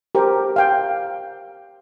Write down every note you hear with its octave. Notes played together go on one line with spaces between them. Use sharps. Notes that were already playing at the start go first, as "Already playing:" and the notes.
G4 A#4 C5 G5
F5 G5